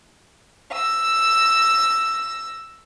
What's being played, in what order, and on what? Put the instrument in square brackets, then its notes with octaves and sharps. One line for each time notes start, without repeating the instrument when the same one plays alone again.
[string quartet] E6 A#6